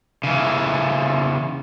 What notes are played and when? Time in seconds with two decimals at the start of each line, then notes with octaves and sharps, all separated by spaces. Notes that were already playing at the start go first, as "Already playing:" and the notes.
0.24 C#3 E3